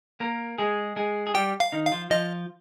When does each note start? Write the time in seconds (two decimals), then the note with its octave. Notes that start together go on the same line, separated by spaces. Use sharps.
0.20 A#3 A#4
0.58 G#3 G#4
0.96 G#3 G#4
1.27 G#4
1.34 G3 G4 G5
1.60 F5
1.72 D#3 D#4
1.86 F5
1.92 F3 F4
2.10 F3 F4 D#5